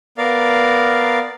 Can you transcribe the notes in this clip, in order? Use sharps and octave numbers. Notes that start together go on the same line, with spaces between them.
B3 A#4 D5 F5